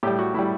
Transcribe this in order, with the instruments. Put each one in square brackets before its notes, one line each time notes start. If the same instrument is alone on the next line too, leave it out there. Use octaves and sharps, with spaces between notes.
[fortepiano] A2 G3 G4
F#4
A2 G3 E4